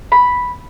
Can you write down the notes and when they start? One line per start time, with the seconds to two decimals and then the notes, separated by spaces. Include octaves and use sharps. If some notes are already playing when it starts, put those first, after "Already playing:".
0.12 B5